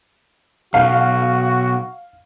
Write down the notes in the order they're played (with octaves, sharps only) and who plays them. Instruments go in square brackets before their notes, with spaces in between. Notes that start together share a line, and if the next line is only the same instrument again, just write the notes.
[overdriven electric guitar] B1 [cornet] F#4 [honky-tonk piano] F5